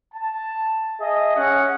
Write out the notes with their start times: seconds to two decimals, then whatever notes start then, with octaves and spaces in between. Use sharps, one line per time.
0.14 A5
1.00 G#4 D#5 E5
1.35 C#4 F#5